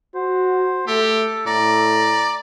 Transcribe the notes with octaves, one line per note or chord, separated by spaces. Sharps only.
F#4 C5
A3 G4 A4
A2 D5 A#5